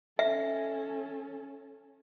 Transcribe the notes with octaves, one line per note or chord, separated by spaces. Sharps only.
C#4 A4 E5